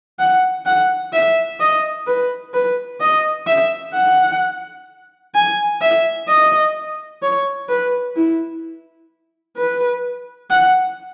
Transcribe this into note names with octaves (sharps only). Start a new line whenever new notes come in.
F#5
F#5
E5
D#5
B4
B4
D#5
E5
F#5
G#5
E5
D#5
C#5
B4
E4
B4
F#5